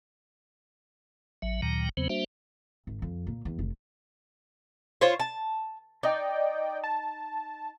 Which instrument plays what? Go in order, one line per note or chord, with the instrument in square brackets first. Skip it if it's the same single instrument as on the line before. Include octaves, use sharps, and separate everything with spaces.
[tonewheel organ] A1 F#3 E5
D2 A#2 D#3 F#3 G5 A#5
E2 C#3 F#3 B3 C4 C5
G3 A#3 D4 F#4 C5 E5
[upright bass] G#1
F2
A#2
E2
F1
[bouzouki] F4 C5 C#5
A5
[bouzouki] D#4 [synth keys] D5 D#5 G5
[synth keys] A5